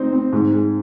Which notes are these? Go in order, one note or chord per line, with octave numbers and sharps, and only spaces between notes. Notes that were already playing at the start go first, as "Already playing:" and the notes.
Already playing: C4 D#4 C5
C4
G#2
G#3